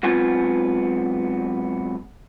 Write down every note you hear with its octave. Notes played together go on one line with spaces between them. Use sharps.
G#2 F#3 B3 C4 F4 G#5